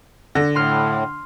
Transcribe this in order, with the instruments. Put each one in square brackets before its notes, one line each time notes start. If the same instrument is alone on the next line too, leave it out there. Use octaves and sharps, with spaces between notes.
[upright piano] D3 [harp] A#6
[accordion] A2 [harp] C6 F6